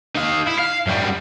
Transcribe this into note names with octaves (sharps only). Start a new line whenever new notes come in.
D#4 F5
E4
F5
F#2 G3